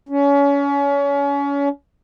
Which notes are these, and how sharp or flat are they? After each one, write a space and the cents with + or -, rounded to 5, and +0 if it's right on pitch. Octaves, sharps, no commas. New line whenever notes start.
C#4 +30